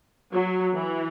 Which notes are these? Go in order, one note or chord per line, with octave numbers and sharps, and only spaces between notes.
F#3
E3